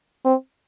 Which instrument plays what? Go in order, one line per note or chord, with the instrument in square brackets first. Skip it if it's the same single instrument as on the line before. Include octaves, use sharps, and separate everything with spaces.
[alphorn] C4